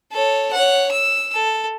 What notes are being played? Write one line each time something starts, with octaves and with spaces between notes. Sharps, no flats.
A4 C#5
C#5 F#5
E6
A4